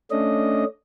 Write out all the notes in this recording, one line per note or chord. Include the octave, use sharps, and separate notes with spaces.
A3 C#4 D4 D#5